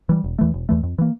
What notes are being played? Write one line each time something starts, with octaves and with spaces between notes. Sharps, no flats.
E3 G3
E1
E2 E3 A3
E1
E2 E3 A3
F2
E3 A#3